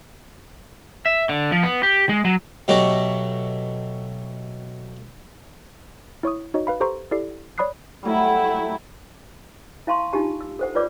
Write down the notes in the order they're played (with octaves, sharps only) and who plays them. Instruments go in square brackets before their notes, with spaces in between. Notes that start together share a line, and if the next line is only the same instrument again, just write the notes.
[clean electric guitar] E5
D3
F3
B3
G4
G#3
F#3
[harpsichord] B2 F#3 A3 F#4 G4
[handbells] E4 C#5 C#6 D#6
D#4 F#4 C#5 D#5
B4 F5 B5
G4 A4 C5 A#5 C6 C#6
E4 G4 A4 D5 C7
C#5 D5 B5 D#6 F#6 C7
[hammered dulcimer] F#3 G3 [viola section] A3 E4
[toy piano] E4 F5 A5 C6 C#6
D4 D#4 F4 G4 A5
E6
A4 C5 F#5
F4 B4 C#5 D5 D6